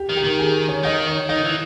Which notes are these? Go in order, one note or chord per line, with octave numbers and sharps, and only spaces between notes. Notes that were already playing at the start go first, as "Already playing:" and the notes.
Already playing: G4
D#3
G4
D#3
G#4
C#5
D#3 D#5
C#5
D#3 D#5
E3